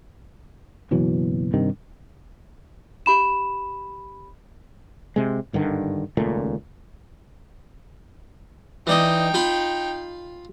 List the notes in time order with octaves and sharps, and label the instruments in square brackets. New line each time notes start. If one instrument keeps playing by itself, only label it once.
[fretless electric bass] F#1 B2 E3 F#3
G2 C3 D#3
[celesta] G4 B5 E7
[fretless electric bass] C3 G#3
G#1 G2 D3 D#3
D#1 C#2 A#2 A3
[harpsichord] E3 D5 D#5 [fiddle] D#4 G5
[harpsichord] F4 F5 B5